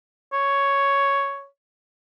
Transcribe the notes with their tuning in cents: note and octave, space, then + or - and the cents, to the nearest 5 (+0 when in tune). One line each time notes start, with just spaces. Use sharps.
C#5 +5